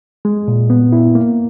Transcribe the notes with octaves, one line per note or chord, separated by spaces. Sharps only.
G#3
A#2
B3
E4
A#3